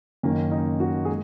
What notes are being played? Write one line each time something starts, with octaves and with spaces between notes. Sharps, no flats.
F#1 F#2 D#3 A#3 C#4
D#4
F#4
G#4
G#3